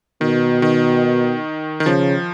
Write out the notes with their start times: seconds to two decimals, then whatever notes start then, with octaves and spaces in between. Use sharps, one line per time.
0.21 B2 D#3
0.62 D#3
1.80 D#3
1.86 C#3 F3